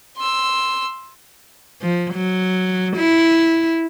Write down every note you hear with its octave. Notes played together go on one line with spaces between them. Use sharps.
C6 E6
F3
F#3
E4